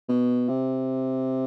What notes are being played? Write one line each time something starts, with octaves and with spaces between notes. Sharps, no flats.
B2
C3